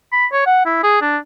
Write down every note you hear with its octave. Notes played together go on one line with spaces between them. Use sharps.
B5
C#5
F#5
E4
G#4
D4